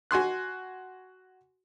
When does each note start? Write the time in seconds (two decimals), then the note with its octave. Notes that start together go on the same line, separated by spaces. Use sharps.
0.11 F#4 G#5 C6 F#6